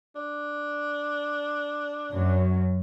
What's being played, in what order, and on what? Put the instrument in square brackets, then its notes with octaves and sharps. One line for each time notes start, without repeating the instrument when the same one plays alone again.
[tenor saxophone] D4
[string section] F#2 F#3